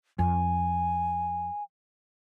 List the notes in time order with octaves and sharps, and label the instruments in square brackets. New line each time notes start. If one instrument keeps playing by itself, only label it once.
[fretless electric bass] F2 [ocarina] G#5